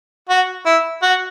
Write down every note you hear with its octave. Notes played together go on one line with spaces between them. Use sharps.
F#4
E4
F#4